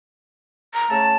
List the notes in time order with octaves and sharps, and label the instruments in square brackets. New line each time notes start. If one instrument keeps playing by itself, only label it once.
[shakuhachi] A#5
[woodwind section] C#3 A3 A5